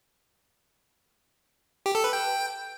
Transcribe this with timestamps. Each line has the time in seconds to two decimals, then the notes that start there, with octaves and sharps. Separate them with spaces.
1.86 G4
1.95 A4
2.04 B4
2.13 G5